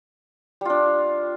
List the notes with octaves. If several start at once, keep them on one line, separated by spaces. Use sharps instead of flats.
G3 D4 F4